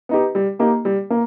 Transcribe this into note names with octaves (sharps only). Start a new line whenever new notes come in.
B3 D#4 G4
G3
A#3 D#4 G4
G3
A#3